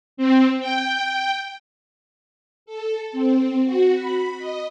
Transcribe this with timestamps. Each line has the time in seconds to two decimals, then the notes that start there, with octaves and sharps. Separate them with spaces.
0.17 C4
0.60 G5
2.66 A4
3.12 C4
3.64 F#4
3.95 B5
4.39 D#5